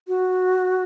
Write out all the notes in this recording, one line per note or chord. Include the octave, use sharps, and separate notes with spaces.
F#4